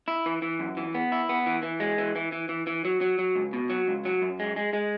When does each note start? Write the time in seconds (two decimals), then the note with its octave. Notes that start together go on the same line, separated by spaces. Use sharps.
0.08 E4
0.26 E3
0.42 E3
0.59 F#2
0.77 E3
0.94 B3
1.12 E4
1.29 B3
1.46 E3
1.63 E3
1.80 G#3
1.98 E3
2.16 E3
2.32 E3
2.49 E3
2.67 E3
2.85 F#3
3.01 F#3
3.19 F#3
3.35 C#2
3.53 B2
3.70 F#3
3.88 C#2
4.05 F#3
4.22 F#2
4.39 G#3
4.56 G#3
4.73 G#3